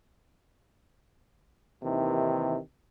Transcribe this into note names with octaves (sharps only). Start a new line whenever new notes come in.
D#2 C3 D#3 E3